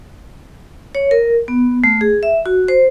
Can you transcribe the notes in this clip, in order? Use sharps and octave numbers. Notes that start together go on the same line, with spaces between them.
C#5
A#4
B3
A3
G#4
E5
F#4
C5